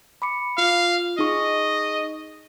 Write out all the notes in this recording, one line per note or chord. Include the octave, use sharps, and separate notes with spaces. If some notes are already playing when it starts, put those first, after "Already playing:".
B5 D6 C#7
F4 F5
D#4 G#4 D#5 C#6